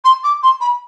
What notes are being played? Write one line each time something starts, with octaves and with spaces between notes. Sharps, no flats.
C6
D6
C6
B5